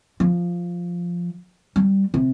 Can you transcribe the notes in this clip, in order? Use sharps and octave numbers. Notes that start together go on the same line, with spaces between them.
F3
G3
C3